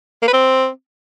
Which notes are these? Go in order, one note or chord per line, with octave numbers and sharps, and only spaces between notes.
A#3
B4
C4